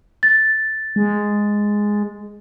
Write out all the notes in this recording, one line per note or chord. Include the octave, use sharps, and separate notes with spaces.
A6
G#3